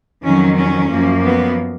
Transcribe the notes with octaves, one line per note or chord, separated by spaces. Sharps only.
F2 D#3 F#3 C#4
C#4
F#2 F3 A#3
B3